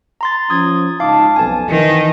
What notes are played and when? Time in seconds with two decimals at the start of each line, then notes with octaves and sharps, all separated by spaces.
0.21 A#5 C6 A6
0.50 F3 C#4 D#6 G#6
1.00 C#2 D#4 F5 A5 D6
1.36 B1 F2 G#5 A5
1.68 D#3 E3